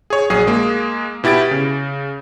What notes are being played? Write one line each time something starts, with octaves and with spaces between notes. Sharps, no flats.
G#4 C#5
A#1 F#3 G#4 D#6 C7
G#3 A#3
B2 E4 G4 A6 D7
C#3